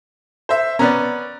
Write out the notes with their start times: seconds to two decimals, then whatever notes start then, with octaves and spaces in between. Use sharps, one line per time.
0.49 C5 E5
0.79 B3 C#4 D5 A#5